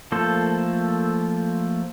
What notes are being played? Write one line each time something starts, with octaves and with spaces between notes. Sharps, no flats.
F3 A3 A#3 A4 C5